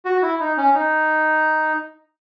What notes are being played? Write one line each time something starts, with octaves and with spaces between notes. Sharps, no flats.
F#4
E4
D#4
C#4
D#4